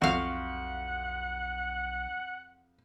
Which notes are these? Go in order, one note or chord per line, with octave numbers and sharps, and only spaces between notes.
B1 F2 F#4 F5 F#5